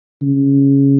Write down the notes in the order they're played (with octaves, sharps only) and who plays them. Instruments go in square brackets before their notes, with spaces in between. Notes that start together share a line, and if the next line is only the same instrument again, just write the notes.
[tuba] C#3